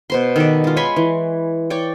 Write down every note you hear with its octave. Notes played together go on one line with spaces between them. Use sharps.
B2 C5 C6
D#3 A4 B4 D5
G#3 F4
C#5 G#5 B5 C6
E3
C#5 D5 G5